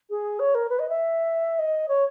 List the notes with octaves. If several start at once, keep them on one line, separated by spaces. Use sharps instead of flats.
G#4
C#5
A#4
B4
D#5
E5
D#5
C#5